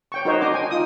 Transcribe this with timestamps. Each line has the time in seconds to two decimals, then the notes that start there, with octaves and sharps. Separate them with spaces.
0.12 C#5 G5 C#6
0.25 D#4 F#4 A#4 C5 C#5 D#5
0.41 D4 D#5 C6 D6
0.54 G5 G#5
0.70 D#4 F4 D#6